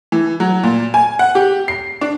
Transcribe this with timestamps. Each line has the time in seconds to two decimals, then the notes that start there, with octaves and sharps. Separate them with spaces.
0.12 E3
0.40 F#3
0.63 A#2
0.94 G#5
1.19 F#5
1.35 G4
1.68 C7
2.01 D4